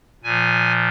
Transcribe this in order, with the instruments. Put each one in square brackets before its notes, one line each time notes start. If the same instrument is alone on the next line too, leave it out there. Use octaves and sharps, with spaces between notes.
[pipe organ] A#2 F3 G#5